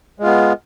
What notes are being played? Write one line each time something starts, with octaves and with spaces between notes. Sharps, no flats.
G#3 B3 F4